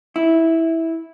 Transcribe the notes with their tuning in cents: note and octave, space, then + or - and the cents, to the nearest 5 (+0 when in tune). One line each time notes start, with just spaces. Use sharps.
E4 -10